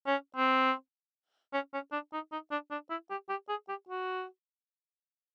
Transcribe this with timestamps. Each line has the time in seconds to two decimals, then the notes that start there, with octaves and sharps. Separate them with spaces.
0.07 C#4
0.36 C4
1.53 C#4
1.73 C#4
1.92 D4
2.13 D#4
2.32 D#4
2.51 D4
2.71 D4
2.90 E4
3.10 G4
3.29 G4
3.49 G#4
3.68 G4
3.89 F#4